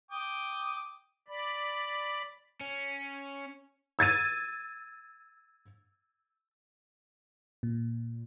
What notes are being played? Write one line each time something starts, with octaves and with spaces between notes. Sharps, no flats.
G5 D6 D#6
D5 B5
C#4
E6 G#6 A6 D#7
A#2